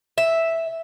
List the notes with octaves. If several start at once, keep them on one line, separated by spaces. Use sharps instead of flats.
E5